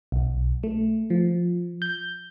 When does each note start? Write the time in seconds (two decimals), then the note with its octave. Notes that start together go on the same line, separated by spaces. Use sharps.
0.12 B1
0.63 A3
1.10 F3
1.82 G6